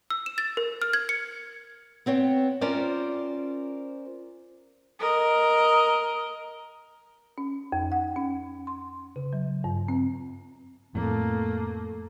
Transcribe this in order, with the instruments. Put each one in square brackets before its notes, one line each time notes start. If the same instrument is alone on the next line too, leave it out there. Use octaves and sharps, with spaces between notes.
[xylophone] E6
E7
A6
A#4
F6
G#6
C#7
[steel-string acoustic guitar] B3 C4 C#5 G5
C#4 F4 A#4 C5 D5
[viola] A#4 D#5
[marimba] C#4
F2
F#5
C#4
C6
C#3
F#3
G2
C4
[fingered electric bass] F2 A2 [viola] A3 A#3